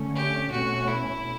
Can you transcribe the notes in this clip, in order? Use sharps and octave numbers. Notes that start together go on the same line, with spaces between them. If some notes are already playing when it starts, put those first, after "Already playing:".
Already playing: D3 A3 C#4
G4
B2 A3 C#4 F#4
E4